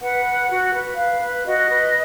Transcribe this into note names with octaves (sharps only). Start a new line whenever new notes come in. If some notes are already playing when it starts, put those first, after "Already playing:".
B4 F#5
B4
F#4
B4
B4 F5
B4
F#4 D#5
B4